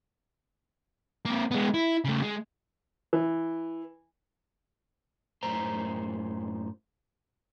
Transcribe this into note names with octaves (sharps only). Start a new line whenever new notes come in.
A#3 C4
G#3 B3
E4
C#3 A3
G#3
E3
F#2 A2 C5 A#5